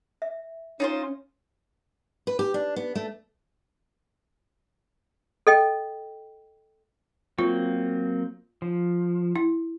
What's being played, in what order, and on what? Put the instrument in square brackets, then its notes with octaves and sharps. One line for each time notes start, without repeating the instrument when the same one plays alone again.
[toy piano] E5
[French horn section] C#4 [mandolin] D#4 F4 C5 [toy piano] C#5
[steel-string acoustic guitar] B4
G4
D4
B3
A3
[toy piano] A4 D#5 G5
[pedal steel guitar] F#3 A#3 C4 [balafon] F4
[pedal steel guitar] F3
[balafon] E4